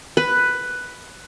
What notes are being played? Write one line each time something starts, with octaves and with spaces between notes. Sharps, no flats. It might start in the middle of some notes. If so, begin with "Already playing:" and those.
B4